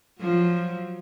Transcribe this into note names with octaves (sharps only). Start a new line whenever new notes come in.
F3 F#3